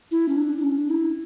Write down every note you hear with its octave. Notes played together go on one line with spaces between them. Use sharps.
E4
C#4
D4
D4
C#4
D4
E4